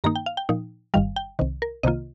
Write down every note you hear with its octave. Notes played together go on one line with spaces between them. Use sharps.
G2 D#3 A#3 D#4 A#5
G5
F5
G5
A#2 F3 D#4
G1 G2 D#3 G3 F5
G5
C2 C3 D#3
A#4
C2 C3 D#3 A#3 F4 D#5